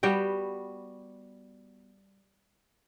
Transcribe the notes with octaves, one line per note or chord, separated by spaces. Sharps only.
G3 B3 F#4 G5